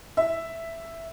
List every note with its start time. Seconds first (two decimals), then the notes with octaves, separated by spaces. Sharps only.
0.17 E5